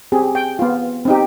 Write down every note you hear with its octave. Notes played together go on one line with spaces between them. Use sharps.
C4 G4 G#4
G5
B3 F4
C4 D#4 G4